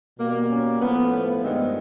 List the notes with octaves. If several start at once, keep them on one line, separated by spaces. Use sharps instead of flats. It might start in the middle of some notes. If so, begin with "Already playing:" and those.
B2 G3 A#3
C#4
A2 F3 A3 B3
B3
G2 D#3 G#3 B3 C4